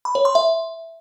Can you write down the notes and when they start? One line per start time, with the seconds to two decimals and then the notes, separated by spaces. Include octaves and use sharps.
0.05 B5
0.15 C#5
0.25 C6
0.35 E5